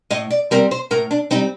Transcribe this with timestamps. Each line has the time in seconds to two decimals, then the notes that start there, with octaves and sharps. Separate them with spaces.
0.11 A2 D#5
0.31 D5
0.51 G3 C4 A#4
0.71 C5
0.91 A2 A#4
1.11 D4
1.31 G3 C4 D#4